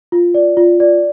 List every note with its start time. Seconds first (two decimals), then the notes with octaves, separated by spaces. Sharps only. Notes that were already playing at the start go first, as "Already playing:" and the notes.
0.12 F4
0.34 D5
0.57 F4
0.80 D5